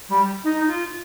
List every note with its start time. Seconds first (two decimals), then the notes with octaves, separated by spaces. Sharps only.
0.09 G3
0.44 D#4
0.67 F4